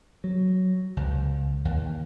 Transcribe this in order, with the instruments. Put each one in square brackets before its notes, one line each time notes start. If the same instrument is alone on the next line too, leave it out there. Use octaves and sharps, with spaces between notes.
[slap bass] F#3
C#2
D#2